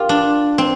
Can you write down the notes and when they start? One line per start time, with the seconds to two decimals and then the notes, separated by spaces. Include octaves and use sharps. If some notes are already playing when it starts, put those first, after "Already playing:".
Already playing: A#3 F4 G4
0.09 D4
0.58 C4